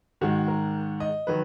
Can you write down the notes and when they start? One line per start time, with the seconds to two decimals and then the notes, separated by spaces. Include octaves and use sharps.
0.21 G#2 D#3 G#3 F#4
0.48 A#4
1.00 D#5
1.27 D#3 F#3 B4